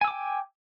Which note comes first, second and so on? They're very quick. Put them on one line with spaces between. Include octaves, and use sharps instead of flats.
G#5 E6 D6 G5